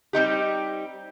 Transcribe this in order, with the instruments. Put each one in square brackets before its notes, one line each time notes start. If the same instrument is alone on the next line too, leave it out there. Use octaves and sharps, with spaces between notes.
[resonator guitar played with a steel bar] G3 C4 D#4 G4